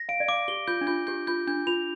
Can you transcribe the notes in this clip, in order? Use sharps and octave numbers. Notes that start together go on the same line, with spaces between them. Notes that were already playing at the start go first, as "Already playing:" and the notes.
Already playing: A#6
F5 D7
D5
F5 D6
G4 G7
F4 G6
D4
F4 G6
G4 G6
F4 G6
D4 G6
F4 F7